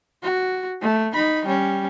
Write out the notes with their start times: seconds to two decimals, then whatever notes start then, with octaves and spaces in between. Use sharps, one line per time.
0.23 F#4
0.82 A3
1.13 D#4 B5
1.45 G3 C#4